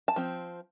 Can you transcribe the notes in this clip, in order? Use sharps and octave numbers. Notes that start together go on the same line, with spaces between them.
A5
F3 C4